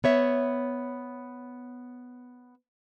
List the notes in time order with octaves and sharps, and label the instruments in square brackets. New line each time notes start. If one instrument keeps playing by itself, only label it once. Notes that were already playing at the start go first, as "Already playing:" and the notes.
[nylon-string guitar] B3 C#5 E5